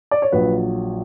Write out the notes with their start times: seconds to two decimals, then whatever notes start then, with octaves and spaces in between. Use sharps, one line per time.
0.11 D5
0.22 C#5
0.32 A#1 A#2 F#3 B4